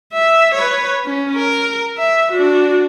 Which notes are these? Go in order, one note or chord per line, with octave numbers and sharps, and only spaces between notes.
E5
B4 C#5
C#4
A#4
E5
D4 F#4